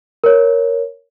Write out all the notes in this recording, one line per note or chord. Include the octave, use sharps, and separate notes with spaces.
A#4 C#5